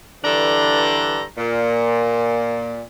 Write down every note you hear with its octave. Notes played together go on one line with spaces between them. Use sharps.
G2 D3 E3 D4 A4 A#5
A#2